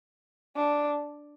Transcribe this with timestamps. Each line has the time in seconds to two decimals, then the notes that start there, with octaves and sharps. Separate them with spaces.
0.56 D4